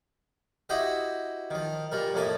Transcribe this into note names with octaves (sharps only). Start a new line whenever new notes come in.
E4 F#4 G4 C5 D#5
D#3 F3
A#2 G3 A#4
F2 A2 A#3 A5 D#6